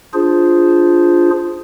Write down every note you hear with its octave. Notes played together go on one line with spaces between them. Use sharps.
D4 F4 G#4 C5